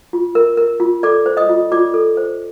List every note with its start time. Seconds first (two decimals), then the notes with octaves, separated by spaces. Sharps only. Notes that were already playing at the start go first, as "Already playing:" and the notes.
0.13 F4
0.35 A#4
0.57 A#4
0.80 F4
1.03 A4 D5 D6
1.26 C5
1.37 D#5 D#6
1.49 F4
1.72 F4 D5 D6
1.94 A4
2.17 C5